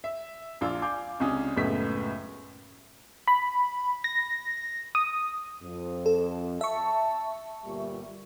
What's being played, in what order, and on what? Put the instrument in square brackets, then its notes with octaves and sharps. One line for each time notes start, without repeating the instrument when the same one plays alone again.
[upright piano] E5
A#1 D4 F4 E6
F5 G#5 D6 G6
C#2 C3 C#4 D4 D#6
F#1 C#2 A2 B3 B6
[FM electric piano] B5
A#6
D#6
[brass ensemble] F2
[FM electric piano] A4
[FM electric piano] E5 C#6 [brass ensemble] A5
[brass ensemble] G1 A#2 G3